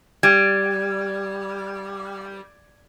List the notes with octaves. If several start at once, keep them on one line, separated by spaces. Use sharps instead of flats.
G3 G#6